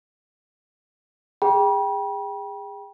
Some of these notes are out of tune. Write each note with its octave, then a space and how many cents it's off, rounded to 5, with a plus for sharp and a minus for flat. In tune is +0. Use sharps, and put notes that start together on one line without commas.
G#4 -25 G5 +0 B5 -40